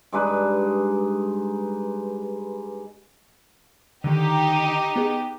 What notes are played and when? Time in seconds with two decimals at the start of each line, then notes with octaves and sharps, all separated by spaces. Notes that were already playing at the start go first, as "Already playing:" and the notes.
0.12 G2 G#3 D#4 B4
4.04 D3 D#3 D#4 G4 D#5
4.96 B3 G#4